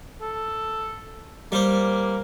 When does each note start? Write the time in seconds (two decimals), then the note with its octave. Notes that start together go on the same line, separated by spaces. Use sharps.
0.22 A4
1.52 G3 A#3 C5